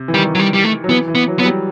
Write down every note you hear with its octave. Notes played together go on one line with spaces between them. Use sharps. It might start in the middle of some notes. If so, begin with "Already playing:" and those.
Already playing: C3
E3
D#3 G3
F#3
G3
G3
A3
F#3
E3 B3
E3
B3
F#3
F#3 B3
G3